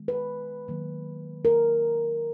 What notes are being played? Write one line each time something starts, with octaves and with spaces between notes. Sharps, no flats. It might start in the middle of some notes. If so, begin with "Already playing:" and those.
Already playing: D#3 G#3 B3
B4
D#3 F#3 A#3
A#4